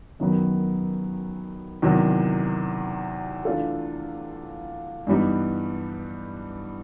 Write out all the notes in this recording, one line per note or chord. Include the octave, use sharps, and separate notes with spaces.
F#2 D#3 F#3 B3
E2 C3 D#3 F#3
E3 A3 D4 F4 A4
G2 E3 G3 B3 D#4